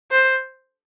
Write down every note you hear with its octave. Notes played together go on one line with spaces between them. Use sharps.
C5